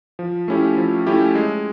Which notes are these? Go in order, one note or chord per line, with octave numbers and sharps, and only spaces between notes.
F3
A3 C#4 E4 G4
F3
A3 C#4 E4 G4
G#3